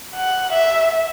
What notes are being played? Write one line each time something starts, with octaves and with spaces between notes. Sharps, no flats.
F#5
E5